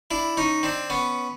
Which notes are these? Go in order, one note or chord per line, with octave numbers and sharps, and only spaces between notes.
D4 E4
C#4 D#4
C4 D4
B3 C#4